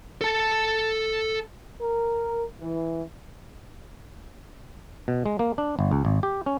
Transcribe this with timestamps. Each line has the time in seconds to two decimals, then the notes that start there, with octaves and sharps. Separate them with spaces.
0.21 A4 A5
1.81 A#4
2.60 E3
5.08 B2
5.26 G#3
5.39 A#3
5.58 D4
5.79 G1
5.91 C#2
6.05 G#1
6.23 G4
6.46 C#4